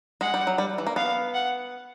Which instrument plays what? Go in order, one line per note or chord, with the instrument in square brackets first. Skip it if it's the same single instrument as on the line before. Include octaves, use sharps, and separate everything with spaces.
[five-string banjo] G#3 [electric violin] F#5
[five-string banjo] G3
F#3
G3
E3
A#3
[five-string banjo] B3 [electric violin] F5
[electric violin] F#5